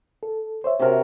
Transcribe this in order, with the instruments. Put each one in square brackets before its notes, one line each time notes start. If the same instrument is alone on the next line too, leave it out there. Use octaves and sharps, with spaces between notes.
[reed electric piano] A4
C5 C#5 E5
[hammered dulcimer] C3 F#4 A#4